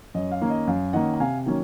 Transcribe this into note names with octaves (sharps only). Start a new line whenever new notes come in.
F#2 D#5
F5
D#3 A#3 C#4
D#5
F#2 F5
D#3 A#3 C#4 D#5 F#5
A#5
C3 F5 G#5
D#3 F#3 A#3 C#4